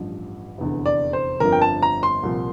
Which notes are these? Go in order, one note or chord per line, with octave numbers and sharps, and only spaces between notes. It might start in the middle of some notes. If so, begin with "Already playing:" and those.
Already playing: A1 G2 F3
F1 E2 D3
D5
C5
G1 F2 D3 F3 A#4
G5
A5
A#5
C6
C2 A#2 F3